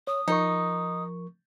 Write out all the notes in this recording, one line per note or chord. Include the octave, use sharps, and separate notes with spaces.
C#5 D#6
F3 D#4 A#4 C#6